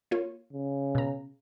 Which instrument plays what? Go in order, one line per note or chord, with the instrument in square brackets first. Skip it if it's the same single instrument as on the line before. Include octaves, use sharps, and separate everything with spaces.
[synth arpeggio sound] A#3 F4 C#5
[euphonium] C#3
[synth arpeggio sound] B2 A#5